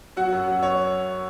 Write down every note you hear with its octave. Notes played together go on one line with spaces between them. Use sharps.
F#3 F#4 F#5
F#2
F#3
C#5